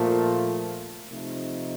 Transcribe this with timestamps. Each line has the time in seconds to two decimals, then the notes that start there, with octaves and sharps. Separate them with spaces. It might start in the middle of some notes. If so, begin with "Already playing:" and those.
Already playing: A#2 F3 A3
1.09 C3 F3 A3 C4 D#4